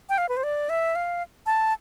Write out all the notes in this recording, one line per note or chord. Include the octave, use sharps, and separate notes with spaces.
G5
F5
B4
C5
D5
E5
F5
A5